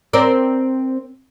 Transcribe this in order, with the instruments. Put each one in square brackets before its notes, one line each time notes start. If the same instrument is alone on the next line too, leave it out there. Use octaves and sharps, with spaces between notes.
[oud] C4 A#4 D5